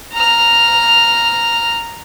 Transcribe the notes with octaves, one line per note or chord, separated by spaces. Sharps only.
A#5 F6